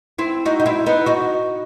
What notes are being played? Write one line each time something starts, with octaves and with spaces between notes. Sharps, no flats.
C4 E4
D#4 F#4
D#4
C4 E4
B3 D#4
D#4 F#4